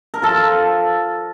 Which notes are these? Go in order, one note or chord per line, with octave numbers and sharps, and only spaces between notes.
A#4
F3 A4